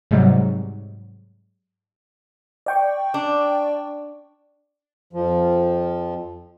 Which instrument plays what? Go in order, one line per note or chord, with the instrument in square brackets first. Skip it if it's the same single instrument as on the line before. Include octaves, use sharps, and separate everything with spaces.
[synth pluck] G#2 C3 F#3 G3
[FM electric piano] D5 G5 C#6
[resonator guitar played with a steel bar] D4
[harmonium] F2 F3